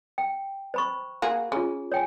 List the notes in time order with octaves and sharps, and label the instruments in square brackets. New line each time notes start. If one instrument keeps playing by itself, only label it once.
[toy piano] G5
C5 B5 C#6
[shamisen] A#3 F#4 G#4
[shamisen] C#4 [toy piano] F4 G#4
[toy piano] C#5 G5 G#5